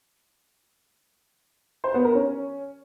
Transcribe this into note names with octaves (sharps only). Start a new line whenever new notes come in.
C5
B3
A#4
C#4